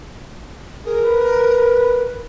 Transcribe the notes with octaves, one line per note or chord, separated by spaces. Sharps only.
G#4 A#4
B4